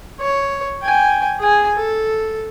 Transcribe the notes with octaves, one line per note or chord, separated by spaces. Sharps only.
C#5
G5 G#5
G#4 G#5
A4